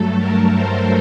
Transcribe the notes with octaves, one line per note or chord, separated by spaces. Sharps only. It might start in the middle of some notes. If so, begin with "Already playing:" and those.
Already playing: G2 F#3 A3 A4
A#4
C5